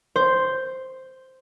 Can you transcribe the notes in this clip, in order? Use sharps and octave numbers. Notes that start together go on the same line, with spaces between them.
C5